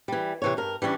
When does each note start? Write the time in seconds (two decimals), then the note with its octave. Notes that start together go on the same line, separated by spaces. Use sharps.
0.08 E3 G3
0.42 C3 E3 C#5
0.57 G2 A#4
0.82 E3 G3 C#4 D4